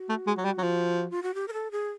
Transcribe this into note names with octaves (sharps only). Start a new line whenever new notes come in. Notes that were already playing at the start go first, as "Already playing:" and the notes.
Already playing: F#4
A3
G#3
F#3
G3
F#3
F3
F4
F#4
G4
A#4
A4
G#4